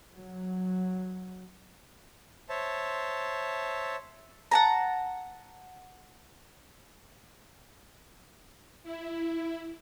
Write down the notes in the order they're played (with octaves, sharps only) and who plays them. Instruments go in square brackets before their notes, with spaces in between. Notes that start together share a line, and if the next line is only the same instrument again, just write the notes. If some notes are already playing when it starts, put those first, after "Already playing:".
[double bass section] F#3
[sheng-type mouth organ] C5 C#5 E5 A5
[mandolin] F#5 A5 A#5
[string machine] E4